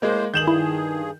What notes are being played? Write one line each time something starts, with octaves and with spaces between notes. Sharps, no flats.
A2 G#3 A#3 C5
G2 D#3 G#4 G6 E7 F#7
E4